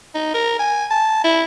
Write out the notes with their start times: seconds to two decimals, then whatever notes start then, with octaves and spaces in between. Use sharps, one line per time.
0.15 D#4
0.34 A#4
0.59 G#5
0.91 A5
1.24 E4